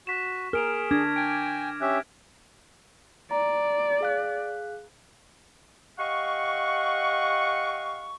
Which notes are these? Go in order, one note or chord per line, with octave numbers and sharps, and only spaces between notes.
F#4 C#6 B6 E7
G#4 A#4 F6 D7 F7
D4 D6 G#6 A#6
G5 G#5 D7
C#4 G4 E5 F#6
D5 A#5
G#4 F5 F#6
G4 D#5 F5 F#5 C#6